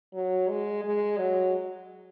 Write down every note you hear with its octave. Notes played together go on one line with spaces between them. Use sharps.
F#3
G#3
G#3
F#3